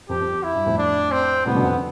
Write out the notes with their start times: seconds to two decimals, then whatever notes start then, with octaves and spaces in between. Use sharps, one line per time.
0.09 F2 G4
0.21 F2
0.43 E4
0.55 G2
0.66 F2 A2
0.78 D4
1.11 C4
1.46 A2 C3 B3
1.55 B2 D3
1.63 F2